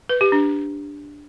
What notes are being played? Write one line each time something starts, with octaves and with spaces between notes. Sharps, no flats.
B4
G4
D4